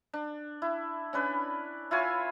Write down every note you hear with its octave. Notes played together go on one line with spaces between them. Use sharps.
D4
E4
C#4 D4 B4
E4 F4 C#5 G#5